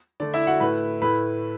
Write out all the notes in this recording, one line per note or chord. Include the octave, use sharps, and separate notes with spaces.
D3 A3 D4 D5
E4 E5
F#4 F#5
A2 A3 E4 B4 B5
A2 A3 E4 B4 B5